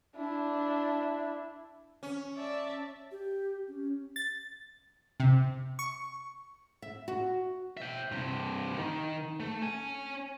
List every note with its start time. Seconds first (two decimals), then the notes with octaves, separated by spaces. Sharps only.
0.15 D4 E4
2.03 C#4
2.36 D5 E5 A5
3.11 G4
3.68 C#4
4.16 A6
5.20 C3
5.79 C#6
6.82 E5
7.08 F#4
7.77 E5 G5
8.12 G2 C3
8.76 D#3
9.40 A3
9.62 C#5 G#5